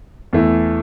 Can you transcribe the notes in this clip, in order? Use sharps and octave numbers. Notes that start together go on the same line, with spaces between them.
E2 E3 A3 E4